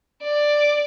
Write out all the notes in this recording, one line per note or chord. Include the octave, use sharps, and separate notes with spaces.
D5